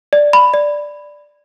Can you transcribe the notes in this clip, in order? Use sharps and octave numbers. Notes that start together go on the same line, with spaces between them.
D5
B5
D5